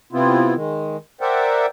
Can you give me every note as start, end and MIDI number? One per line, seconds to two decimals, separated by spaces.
0.13 0.54 48
0.13 0.54 59
0.13 0.54 60
0.13 0.54 64
0.13 0.54 65
0.54 0.97 51
0.54 0.97 56
1.21 1.66 70
1.21 1.66 72
1.21 1.66 74
1.21 1.66 76
1.21 1.66 78
1.21 1.66 79